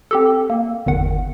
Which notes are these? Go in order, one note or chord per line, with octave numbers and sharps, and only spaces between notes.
C4 G4 A4
A#3
G1 E2 D#3 F#5